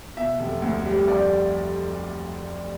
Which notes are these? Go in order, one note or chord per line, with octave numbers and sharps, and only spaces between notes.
B2 E5
F1
D2
G3
F1 D5